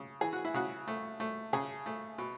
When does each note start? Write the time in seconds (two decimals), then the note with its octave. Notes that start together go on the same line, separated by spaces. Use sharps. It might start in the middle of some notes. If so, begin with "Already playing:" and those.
Already playing: C#3
0.21 E3 G#4
0.33 F#4
0.45 E4
0.54 C#3 F#4
0.88 A3
1.20 A3
1.53 C#3 G#4
1.86 A3
2.18 B2